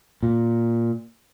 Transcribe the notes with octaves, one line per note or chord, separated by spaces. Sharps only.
A#2